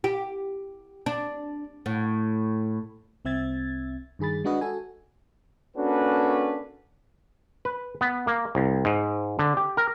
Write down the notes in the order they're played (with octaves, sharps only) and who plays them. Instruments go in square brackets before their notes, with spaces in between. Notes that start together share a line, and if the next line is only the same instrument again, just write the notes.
[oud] G4
D4
A2
[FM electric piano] C2 C4 E5 G#6 A6
G2 D#3 G#4 B5 A6
G#3 D4 F#4 B4 D#5 F#5
F#4 A4 G#5
[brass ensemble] A#3 C#4 D4 F#4 A4 B4
[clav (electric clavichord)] B4
B3
A#3
C2
G#2
D3
G4
A#4